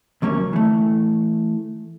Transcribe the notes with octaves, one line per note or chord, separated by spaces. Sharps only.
D2 F#3 A#3 C#4 C#5
E3 A3